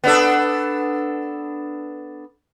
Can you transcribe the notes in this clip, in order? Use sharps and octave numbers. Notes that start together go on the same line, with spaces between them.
B3 D4 A4